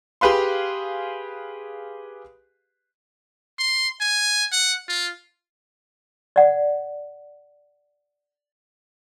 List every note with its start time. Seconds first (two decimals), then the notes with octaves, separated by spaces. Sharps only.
0.21 G4 G#4 B4 F5 C6
3.59 C6
4.01 G#5
4.52 F#5
4.89 F4
6.36 D5 F#5